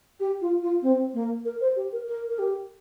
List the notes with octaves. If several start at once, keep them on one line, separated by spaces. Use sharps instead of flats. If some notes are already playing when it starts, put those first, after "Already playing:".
G4
F4
F4
C4
A#3
A#4
C5
G4
A#4
A#4
A#4
G4